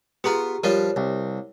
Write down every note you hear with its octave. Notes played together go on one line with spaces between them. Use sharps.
B3 F4 G4 G#4 A#5
F3 G3 F4 A#4 C#5
C2